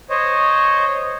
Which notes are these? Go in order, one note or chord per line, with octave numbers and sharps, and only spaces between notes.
C5 C#5 D#5